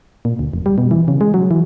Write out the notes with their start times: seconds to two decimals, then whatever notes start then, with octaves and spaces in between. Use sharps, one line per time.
0.25 A#2
0.39 D2
0.53 F1
0.66 G3
0.78 B2
0.91 E3
1.08 C#3
1.21 G#3
1.34 F#3
1.51 E3